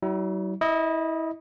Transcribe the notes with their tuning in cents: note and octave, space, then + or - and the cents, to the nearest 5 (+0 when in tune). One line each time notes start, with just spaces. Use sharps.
F#3 +45 E4 -30
E4 -25 D#5 +0